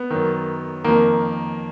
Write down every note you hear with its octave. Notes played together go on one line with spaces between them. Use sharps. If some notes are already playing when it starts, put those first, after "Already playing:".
Already playing: B3
F#2 D#3
F2 D#3 A#3